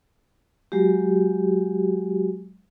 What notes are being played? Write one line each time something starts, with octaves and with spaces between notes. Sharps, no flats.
F#3 G#3 F#4 G4